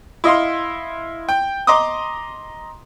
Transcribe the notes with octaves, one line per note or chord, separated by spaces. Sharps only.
E4 D#5 F5 C6
G5
D#5 A#5 C6 D6 D#6